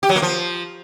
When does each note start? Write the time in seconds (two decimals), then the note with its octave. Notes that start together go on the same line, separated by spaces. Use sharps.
0.03 G4
0.09 F#3
0.16 A#3
0.22 F3